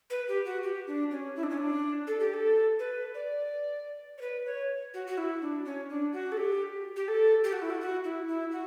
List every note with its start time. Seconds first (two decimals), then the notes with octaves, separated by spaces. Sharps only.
0.10 B4
0.29 G4
0.45 F#4
0.63 G4
0.87 D4
1.11 C#4
1.36 E4
1.43 D4
1.50 C#4
1.58 D4
2.07 A4
2.20 G4
2.34 A4
2.79 B4
3.15 D5
4.18 C#5
4.21 B4
4.46 C#5
4.94 F#4
5.07 F#4
5.18 E4
5.41 D4
5.65 C#4
5.90 D4
6.13 F#4
6.32 A4
6.37 G4
6.96 G4
7.08 A4
7.44 G4
7.53 F#4
7.62 E4
7.70 F#4
7.81 F#4
8.04 E4
8.28 E4
8.52 F#4